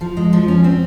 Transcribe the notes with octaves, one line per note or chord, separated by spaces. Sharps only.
F3
G#3
F3
C#4
C4